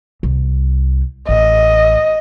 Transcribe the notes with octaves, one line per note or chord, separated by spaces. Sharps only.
C2
A1 D#5